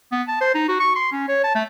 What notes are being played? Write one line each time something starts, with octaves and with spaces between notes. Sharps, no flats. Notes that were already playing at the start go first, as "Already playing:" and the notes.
B3
A5
C5
D#4
F#4
C#6
C6
C#4
C#5
A5
A3